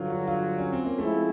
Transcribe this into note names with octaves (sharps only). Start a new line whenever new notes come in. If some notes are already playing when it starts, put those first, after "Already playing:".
Already playing: G2 D3 F#3 F4
F#4
F4
C#4
C4
A#3
F3 G#3 A3 C4 E4 G#4